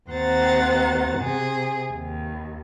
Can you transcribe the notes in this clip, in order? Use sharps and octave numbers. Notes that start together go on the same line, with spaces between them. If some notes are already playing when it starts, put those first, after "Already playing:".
D#2 C4 C5 F#5 A#5 A6
C3 G#4
D#2